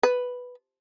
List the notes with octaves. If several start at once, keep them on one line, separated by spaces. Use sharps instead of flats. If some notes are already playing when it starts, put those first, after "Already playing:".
B4